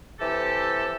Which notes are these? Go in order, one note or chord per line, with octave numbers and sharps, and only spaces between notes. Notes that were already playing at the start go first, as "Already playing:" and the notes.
C3 E3 G4 A4